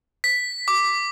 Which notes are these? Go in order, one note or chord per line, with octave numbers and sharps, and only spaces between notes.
B6
D6